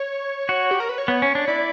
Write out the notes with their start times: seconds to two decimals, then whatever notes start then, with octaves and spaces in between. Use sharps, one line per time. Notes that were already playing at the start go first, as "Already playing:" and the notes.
Already playing: C#5
0.49 F#4
0.71 G4
0.80 A#4
0.89 B4
0.98 C#5
1.08 B3
1.22 C#4
1.35 D4
1.48 E4 D5